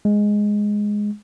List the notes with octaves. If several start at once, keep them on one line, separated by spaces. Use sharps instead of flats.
G#3